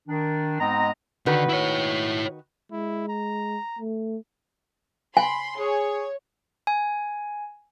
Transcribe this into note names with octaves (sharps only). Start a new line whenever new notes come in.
D#3 D4
G#2 G#3 B3 C4 D#5 A#5
D3 D#3 F#4 B4
E4 C#5
G#3 E4
A#5
A3
G#5 B5 C6
G#4 C#5
G#5